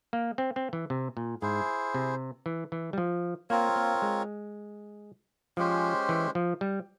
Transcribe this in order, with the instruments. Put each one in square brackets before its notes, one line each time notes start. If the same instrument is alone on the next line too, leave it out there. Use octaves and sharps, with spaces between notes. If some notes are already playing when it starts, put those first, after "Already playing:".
[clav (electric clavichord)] A#3
C4
C4
E3
C3
A#2
[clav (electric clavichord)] G#2 [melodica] E4 G#4 C5
[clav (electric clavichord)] C3
E3
E3
G3
F3
[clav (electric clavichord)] A#3 [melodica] C4 F4 A#4 C#5
[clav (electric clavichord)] A#3
G#3
[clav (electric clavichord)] F3 [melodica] G#3 C#4 G4 C5
[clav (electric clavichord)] E3
F3
G3